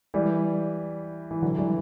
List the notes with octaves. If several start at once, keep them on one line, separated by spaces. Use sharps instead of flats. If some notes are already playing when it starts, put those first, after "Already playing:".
E3 G3
E3
D3 F#3
E3 G3